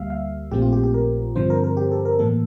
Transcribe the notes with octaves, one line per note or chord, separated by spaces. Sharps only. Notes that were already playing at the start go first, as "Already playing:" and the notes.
Already playing: D2 D3 G3 A#3 E5 F5
F5
A#1 A#2 F3 A3 C4 G4
F4
G4
G4
A#4
G2 D3 F3 C4 C5
A#4
A#4
G4
A4
A#4
A2 E3 A#3 A4